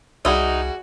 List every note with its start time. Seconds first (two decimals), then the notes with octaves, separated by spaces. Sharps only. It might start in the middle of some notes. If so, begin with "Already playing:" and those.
0.25 C2 G3 D#4 F#4 G#4 E5